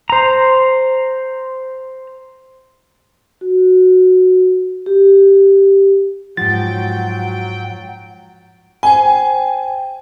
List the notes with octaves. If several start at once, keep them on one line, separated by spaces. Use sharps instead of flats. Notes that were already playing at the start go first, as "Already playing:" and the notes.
C5 A#5
F#4
G4
G#2 F3 F#3 F#5 G5 A6
C5 G5 G#5